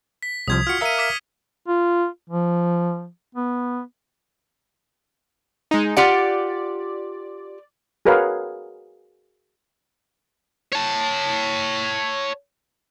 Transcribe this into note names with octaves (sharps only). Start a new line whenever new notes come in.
B6
C2 C3 F3 D#6 G#6
F4 F#4 F6 C#7
A#4 E5 F5 B6 D#7
D6 F6 B6
F4
F3
B3
G#3 D#4
F4 G4 D5 F#5
F#4 G#4 A#4 B4 C#5 F5
C#5 A5